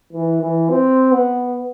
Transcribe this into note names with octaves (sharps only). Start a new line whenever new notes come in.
E3
E3
C4
B3